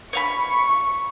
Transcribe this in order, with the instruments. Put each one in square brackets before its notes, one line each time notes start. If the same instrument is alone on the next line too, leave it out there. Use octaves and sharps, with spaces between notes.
[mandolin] C#5 F5 B5 [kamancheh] C#6